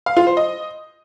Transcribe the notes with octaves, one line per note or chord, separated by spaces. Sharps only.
F5
F4
C5
D#5